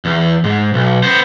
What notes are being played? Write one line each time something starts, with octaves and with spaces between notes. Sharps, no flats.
E2
G#2
B1
B3 C5